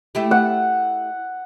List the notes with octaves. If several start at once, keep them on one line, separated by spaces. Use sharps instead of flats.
A3 E4 G4
F#5